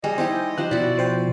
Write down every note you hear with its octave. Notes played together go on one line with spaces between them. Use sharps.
G3 G#4 D#5
D#4 E4 G4 C5 G5
F3 G4 C5 F#6
B2 E4 F#4 D5
F3 C5 G5